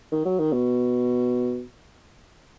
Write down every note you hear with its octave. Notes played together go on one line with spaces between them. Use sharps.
D#3
F#3
D#3
B2